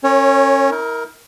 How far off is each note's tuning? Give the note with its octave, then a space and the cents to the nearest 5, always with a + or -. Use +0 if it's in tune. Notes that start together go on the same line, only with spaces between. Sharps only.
C#4 -25 A#4 -40 C#5 +0
E4 -45 A#4 +0